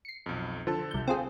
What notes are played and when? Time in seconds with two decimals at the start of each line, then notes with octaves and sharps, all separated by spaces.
0.05 C7 C#7
0.26 B1 F2
0.67 D3 F3 A4 A5
0.91 C2 G6
1.08 C4 F4 G#4